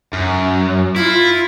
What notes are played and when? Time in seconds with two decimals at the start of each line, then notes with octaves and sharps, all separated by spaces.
0.13 F#2
0.96 E4 F4